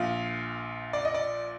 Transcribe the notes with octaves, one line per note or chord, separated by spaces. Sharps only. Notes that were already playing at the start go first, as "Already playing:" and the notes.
Already playing: A#1 A#2 F5
D5
D#5
D5